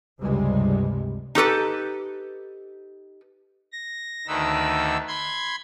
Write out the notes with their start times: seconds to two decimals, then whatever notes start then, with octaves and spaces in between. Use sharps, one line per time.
0.20 C#2 G2 C3 G3 G#3
1.35 D#4 G4 A4 B4
3.72 A#6
4.27 D2 D3 D#3 D#4 B4 E6
5.08 B5 C6 G#6